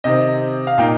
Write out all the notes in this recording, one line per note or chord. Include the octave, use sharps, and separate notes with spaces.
C3 D#3 C4 D#5
F5
A#2 A#3 D#4 G5